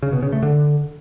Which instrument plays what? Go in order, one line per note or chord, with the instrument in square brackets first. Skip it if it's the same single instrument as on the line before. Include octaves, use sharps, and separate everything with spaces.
[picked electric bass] C#3
B2
C#3
A3
D3